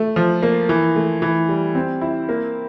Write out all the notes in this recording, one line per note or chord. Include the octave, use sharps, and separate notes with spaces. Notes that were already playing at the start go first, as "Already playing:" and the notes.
Already playing: A3
F3
A#3
E3
A3
E3
G3
C4
E4
A#3